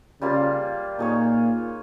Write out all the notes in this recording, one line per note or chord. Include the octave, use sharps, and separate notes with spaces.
C#3 G3 A#3 F4
A#2 D#4 G#4 C#5